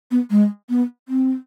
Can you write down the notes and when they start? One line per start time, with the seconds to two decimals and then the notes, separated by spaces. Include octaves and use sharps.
0.11 B3
0.31 G#3
0.69 B3
1.09 C4